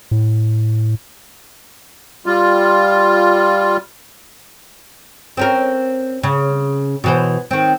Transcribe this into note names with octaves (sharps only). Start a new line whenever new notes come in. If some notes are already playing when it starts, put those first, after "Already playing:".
A2
G3 F4
C4 C#4 A#4
C#3
B2 E3 C5
D#3 C4